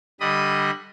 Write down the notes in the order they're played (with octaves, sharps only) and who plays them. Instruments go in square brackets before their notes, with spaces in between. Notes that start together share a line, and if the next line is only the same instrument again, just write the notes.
[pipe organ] D3 G3 D#5 B5 D#6